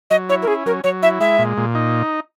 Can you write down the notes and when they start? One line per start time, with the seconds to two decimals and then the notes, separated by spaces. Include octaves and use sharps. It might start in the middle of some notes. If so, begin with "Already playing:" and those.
0.10 F#3 D#5
0.29 E4 C#5
0.42 A#4
0.47 C#4 G#4
0.66 F#3 A#4
0.84 F#3 C#5
1.03 E4 E5
1.20 G#3 E5
1.39 A#2
1.57 A#2
1.75 D#4